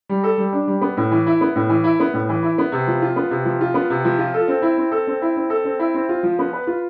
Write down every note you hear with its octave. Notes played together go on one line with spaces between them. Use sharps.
G3
A4
G3
D4
G3
B3
A2
E3
E4
B3
A2
E3
E4
B3
A2
E3
E4
B3
C3
F3
F4
B3
C3
F3
F4
B3
C3
F3
F4
A4
C4
E4
C4
A4
C4
E4
C4
A4
C4
E4
C4
F4
F3
B3
B4
F4